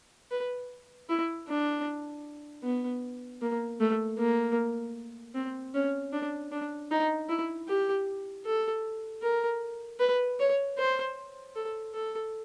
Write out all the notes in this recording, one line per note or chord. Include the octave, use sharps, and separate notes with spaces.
B4
E4
D4
B3
A#3
A3
A#3
C4
C#4
D4
D4
D#4
E4
G4
A4
A#4
B4
C#5
C5
A4
A4